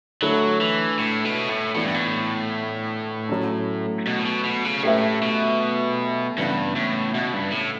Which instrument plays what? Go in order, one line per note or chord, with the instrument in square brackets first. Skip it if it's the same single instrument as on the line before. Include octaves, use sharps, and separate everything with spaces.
[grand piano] D3 A3 E4 A4 C#5 [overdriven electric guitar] F#3
[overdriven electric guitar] E3
A2
B2
A2
[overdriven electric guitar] A2 [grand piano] E3 B3 D4
[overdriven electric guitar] G2
A2
[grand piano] F#3 A3 C#4
[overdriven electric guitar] B2
A2
B2
B2
C#3
[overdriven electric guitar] A2 [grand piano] A3 C#4 G4 B4 E5
[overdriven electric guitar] B2
[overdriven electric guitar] G2 [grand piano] C#3 E3 B3
[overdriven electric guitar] A2
B2
G2
A2